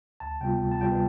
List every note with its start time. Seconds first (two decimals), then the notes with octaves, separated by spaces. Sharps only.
0.20 D2 A5
0.41 C3 G3 B3 F4 G5
0.62 D2
0.72 A5
0.81 C3 G3 B3 F4 G5
0.92 B4